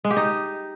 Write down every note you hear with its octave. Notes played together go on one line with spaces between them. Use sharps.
G#3
G4
D#4